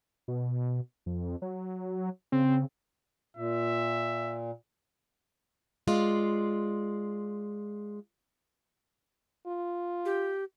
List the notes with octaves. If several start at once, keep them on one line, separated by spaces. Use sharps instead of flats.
B2
F2
F#3
C#3 C4
A#2 E5
G#3 F4 D5
F4
G4